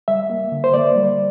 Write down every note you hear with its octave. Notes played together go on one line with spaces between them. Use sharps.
G3 E5
A#3
D3
C5
A#3 D5
G3